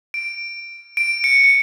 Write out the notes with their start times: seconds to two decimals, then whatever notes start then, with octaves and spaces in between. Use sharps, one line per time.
0.14 D7
0.97 D7
1.24 C#7
1.44 C#7